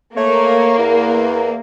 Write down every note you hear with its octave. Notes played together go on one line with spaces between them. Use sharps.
A3 A#3 C#5
E2